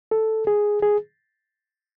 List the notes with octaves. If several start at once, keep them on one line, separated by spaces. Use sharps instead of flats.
A4
G#4
G#4